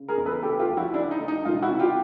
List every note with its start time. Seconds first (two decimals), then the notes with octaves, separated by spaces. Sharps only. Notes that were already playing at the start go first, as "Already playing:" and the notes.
Already playing: C#3
0.08 G#4 A#4
0.18 E2
0.26 A4 B4
0.43 D2 G4 A4
0.59 F4 G4
0.69 F3
0.77 E4 F#4
0.94 D3 D4 E4
1.11 D#4
1.20 D2
1.28 D#4
1.45 E1 D#4 F4
1.62 E4 F#4
1.71 C3
1.80 F4 G4